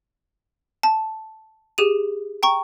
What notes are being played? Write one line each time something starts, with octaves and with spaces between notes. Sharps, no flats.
A5
G4 G#4 D#7
G5 A#5 C#6